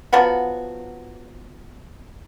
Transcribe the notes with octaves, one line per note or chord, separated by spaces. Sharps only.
F3 F#3 B3 F#4